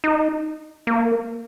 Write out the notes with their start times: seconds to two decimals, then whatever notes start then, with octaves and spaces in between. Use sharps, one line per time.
0.04 D#4
0.87 A#3